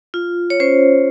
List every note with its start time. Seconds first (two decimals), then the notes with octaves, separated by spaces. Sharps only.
0.14 F4
0.50 C#5
0.60 C#4 C5